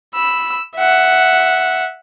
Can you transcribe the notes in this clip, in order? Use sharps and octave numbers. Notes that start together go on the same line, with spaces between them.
B5 E6
E5 F#5